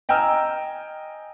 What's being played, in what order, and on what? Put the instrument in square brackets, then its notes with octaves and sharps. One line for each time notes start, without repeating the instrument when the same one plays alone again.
[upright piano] D#5 G5 G#5 A#5 E6 F6